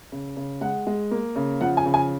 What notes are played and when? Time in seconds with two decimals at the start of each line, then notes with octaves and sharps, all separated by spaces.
0.12 C#3
0.37 C#3
0.61 G#3 F#5
0.87 G#3
1.11 A#3
1.36 C#3
1.61 F3 F#5
1.77 G#5
1.86 C#3
1.94 G#5